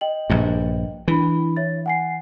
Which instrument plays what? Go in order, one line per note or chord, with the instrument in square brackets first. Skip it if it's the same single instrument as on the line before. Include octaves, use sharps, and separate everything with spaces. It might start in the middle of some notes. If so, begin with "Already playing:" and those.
[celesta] D#5 G5 F#7
[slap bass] A#1 G2
[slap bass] E3 [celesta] D4 E4 B5
[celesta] C#5 E5 A6
F#5 G#5 C7